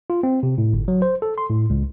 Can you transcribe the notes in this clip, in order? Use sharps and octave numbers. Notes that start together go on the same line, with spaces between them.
F4
C4
C3
A2
G1
F#3
C5
A4
C6
A2
C#2